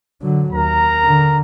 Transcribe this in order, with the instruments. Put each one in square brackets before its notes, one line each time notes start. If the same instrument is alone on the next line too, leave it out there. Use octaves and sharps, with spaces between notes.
[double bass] D3 F#3
[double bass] D#2 [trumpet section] A#4 A#5
[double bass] D3